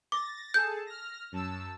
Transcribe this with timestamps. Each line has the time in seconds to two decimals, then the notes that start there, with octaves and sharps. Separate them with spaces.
0.12 D6 A6 A#6
0.54 G#4 A4 A5 G6
0.87 F6 A#6
1.32 F#2 A5 E6